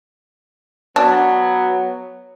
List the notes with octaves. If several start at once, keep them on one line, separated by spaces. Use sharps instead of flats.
F#3 B3 D4